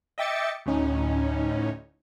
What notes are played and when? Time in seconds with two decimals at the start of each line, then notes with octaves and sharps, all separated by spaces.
0.18 D#5 E5 G5 D6 A6 C#7
0.66 D2 A2 C#4 D#4